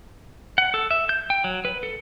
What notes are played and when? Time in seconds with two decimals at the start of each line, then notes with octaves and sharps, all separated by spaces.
0.58 F#5
0.74 A4
0.91 E5
1.09 G6
1.30 G5
1.44 F#3
1.65 B4
1.83 A4